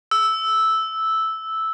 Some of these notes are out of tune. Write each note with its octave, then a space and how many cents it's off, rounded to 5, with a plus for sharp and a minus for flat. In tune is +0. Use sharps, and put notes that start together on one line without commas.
E6 -5